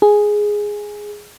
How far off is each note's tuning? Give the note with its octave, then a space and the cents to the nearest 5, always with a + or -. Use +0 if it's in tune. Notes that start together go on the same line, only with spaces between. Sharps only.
G#4 +0